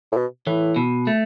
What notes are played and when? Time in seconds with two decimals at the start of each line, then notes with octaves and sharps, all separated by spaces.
0.12 A2
0.17 B2
0.46 A2 E3
0.76 B2
1.07 A3